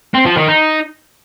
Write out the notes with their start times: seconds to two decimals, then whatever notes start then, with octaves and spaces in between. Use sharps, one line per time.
0.14 C4
0.26 F3
0.37 D#3
0.48 D#4